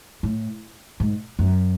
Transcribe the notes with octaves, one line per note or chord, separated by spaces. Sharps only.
A2
G#2
F#2